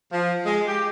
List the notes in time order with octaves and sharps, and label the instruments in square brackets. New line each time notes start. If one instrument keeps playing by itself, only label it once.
[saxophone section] F3
G#3
G4